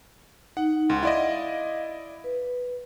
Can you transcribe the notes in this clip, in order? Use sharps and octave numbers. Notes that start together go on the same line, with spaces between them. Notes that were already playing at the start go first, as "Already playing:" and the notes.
D#4 F#5
C#2 F#5 C6
E4 D5 D#5 F5
B4